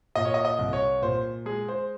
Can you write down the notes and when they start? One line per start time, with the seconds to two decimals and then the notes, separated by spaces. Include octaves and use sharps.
0.15 A#2 D#5
0.25 C#5
0.34 D#5
0.45 D#5
0.59 C2
0.73 C#5
1.02 A#2 C5
1.46 G#3 G#4
1.68 C5